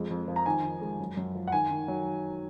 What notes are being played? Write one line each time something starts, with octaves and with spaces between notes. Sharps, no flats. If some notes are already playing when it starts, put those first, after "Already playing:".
Already playing: F2 G#3
F2
F3
A#5
D#3 G#5
D#3
G#3
F#2
F#2
F3
F#5
D#3 G#5
D#3
F#3